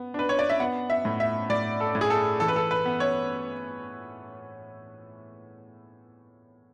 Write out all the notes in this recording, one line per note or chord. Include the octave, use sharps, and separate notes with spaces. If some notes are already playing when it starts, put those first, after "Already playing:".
Already playing: B3
D4 B4
C#5
D5
E5
B3 F#5
E5
A2
E5
A2 D5
A4
A2
G#4
A4
E3 A4
B4
A4
B4
B3
C#5